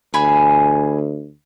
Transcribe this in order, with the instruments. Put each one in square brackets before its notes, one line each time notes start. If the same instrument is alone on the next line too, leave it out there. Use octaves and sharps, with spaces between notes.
[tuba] D2 [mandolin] G#4 G#5 B5